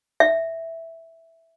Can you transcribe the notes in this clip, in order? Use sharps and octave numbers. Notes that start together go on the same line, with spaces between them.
E5